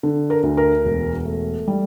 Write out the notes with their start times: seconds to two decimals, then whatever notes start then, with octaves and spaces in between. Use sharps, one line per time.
0.03 D3
0.30 A#4
0.43 D2
0.57 A#4
0.85 E1
1.25 A3
1.68 G3